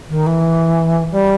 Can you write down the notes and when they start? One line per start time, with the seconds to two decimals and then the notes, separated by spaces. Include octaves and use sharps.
0.09 D#3
0.26 E3
1.11 G3